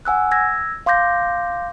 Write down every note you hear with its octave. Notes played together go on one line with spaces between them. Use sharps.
F#5 G#5 E6 F#6
E6 G#6 A#6
F5 C6 D6 G6 A#6